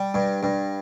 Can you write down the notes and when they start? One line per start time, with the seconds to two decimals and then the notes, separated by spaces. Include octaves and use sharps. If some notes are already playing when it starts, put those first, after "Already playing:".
Already playing: G3
0.14 G2
0.43 G2